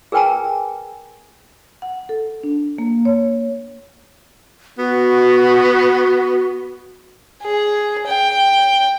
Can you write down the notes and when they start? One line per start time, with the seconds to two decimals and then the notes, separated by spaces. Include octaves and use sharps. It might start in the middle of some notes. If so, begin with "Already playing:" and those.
0.12 G#4 A#4 B4 G5 G#5 A#5
1.82 F#5
2.09 A4
2.44 D4
2.78 A#3
3.05 C#5
4.78 B3 F#4
7.43 G#4
8.07 G5